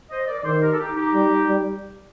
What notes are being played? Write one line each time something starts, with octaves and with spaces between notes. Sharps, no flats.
C5 D#5
A#4 D5
D5
D#3 A4 C5
G4 A#4
A4
D#4 G4
D#4 G4
G3
G3